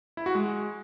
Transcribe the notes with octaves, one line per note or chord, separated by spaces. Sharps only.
E4
F#4
G#3